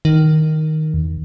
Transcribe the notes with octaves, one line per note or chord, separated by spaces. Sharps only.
D#3
E2